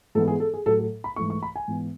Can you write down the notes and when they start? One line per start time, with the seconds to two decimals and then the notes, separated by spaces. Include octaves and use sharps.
0.15 G#2 E3 G#3 B3 A4
0.28 G#4
0.40 A4
0.54 G#4
0.66 A2 F#3 A3 A4
0.79 A4
1.04 B5
1.16 G#2 E3 A3 C#6
1.30 C#6
1.43 B5
1.56 G#5
1.68 G#2 E3 B3